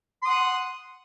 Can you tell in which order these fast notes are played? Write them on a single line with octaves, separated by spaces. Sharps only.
C6 D#6 F#5